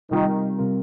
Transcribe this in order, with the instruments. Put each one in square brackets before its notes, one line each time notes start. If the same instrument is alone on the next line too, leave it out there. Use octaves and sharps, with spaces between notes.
[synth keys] C3 G3 C4 F4 A#4 [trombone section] D#3
[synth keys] C3 G3 C4 F4 A#4